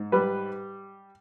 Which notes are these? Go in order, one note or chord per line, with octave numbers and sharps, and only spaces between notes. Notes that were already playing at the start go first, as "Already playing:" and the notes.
Already playing: G#2
G3 B4